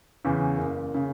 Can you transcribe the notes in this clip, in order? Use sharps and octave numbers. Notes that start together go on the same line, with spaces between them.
E2 C#3
F#1
C#3